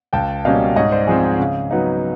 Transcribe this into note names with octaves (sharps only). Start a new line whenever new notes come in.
C#2 G5 A5
B2 G3 A#3 C#4 D#5 F5
G#2 C#5 D#5
C5 D5
F3 G#3 C4 G#4
G#4
C#3
F#3 B3 D#4